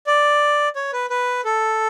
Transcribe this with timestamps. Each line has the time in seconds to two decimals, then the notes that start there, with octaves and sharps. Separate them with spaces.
0.07 D5
0.76 C#5
0.93 B4
1.10 B4
1.45 A4